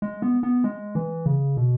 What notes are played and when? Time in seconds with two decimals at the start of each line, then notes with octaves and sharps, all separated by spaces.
0.02 G#3
0.22 B3
0.43 B3
0.64 G#3
0.95 E3
1.26 C#3
1.57 B2